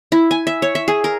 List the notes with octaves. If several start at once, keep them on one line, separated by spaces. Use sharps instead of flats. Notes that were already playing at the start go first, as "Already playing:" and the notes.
E4
G#5
E5
C#5
E5
G#4
A#4